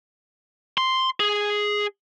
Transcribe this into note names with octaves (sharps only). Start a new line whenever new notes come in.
C6
G#4